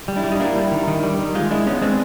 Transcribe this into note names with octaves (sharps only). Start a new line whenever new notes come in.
G3
D4 E4
G3
D#4
A#3 D4 E4
G3
D#3
D#3
G3
D#3
G#3 D#4 F4
G#3 D4 E4
B3 C#4 D#4
G#3 C4 D4